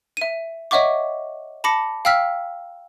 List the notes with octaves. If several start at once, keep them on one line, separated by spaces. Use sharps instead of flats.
E5 D#7
C#5 D#5 E5 F#5 C#6 D6
A5 B5 D6 A#6 C#7
F5 G5 E6 F6 B6